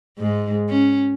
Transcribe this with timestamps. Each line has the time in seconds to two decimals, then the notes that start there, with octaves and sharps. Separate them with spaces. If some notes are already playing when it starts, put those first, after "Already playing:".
0.19 G#2 G#3
0.69 C#4